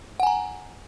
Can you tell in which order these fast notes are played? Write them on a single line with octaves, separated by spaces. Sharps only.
F#5 G#5 A#5